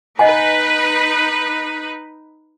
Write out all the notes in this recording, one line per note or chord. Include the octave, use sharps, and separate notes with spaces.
D#4 B4 D#5 F#5 G#5